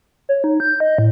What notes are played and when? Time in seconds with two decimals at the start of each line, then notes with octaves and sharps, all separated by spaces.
0.29 C#5
0.44 D#4
0.60 G6
0.80 D#5
0.98 A2